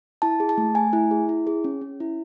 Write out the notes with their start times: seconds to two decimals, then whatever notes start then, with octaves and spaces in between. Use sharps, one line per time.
0.22 E4 A5
0.40 G#4
0.49 A5
0.58 A3
0.75 A3 G#5
0.93 E4
1.11 G#4
1.29 E4
1.47 G#4
1.64 C#4
1.81 C#4
2.00 E4